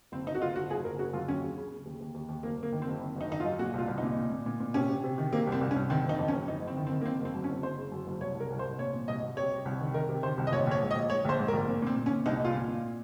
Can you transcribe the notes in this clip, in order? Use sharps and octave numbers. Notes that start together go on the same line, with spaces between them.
F#1 C4
F#1 D#4
F#4
F#1 F4
F#1 F#4
F#1 G#4
F#1 A#4
C#3 F#4
F#2 F4
D#2 C#4
C#3
C#3
C#3
D#2
D#2
D#2
D#2
F#1 A#3
F#1 A#3
D#3
C4
F#1
D#3
F#1 D#4
D#3 D#4
F4
F#2
A#2 F#4
C2 F4
C2
A#2 D#4
A#2
A#2
A#2
A#2
C3 C#4
C3
C3
D#3
C3 A#3
C2
C4
C2
C#4
C2
D#3 C4
F#1 D#4
F2
C#4
F#1
F#1 D#4
F#1
C4
D#3
C4
D#3
A#3
F#1 C4
F#1
C4
F#2
C#4
F#1
F#1 C5
C#3
F#2
F#1
C2 C#5
C2
A#4
C2
C5
C2
A#2 C#5
A#2
C2 D#5
C2
C3 C#5
C3
C2
D#3
D#3 A#4
C3
D#3 C5
C2
D#5
A#1 C#5
A#1 C#5
G#2
D#5
A#1
G#2 C#5
A#1 C5
G#2
A#4
A#1
A#2
A#2 C4
A#2
C#4
A#2
C2 D#4
A#2 F4
A#2
A#2